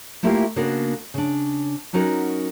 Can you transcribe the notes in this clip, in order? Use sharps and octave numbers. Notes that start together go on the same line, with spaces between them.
A3 A#3 E4 F4 G4 A#4
C#3 A#3 B3 D4 F#4 A#4
C#3 D4
F#3 C#4 D#4 F#4 A#4